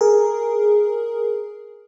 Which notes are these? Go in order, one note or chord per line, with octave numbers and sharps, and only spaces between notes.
G#4 A#4